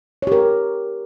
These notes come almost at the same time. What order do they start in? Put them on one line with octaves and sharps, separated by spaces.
C#5 G4 A#4